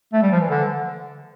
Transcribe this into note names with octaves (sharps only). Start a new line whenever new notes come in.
A3
G3
F3
E3
D3